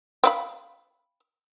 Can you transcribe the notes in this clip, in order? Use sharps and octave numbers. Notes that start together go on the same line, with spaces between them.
C4 F5 B5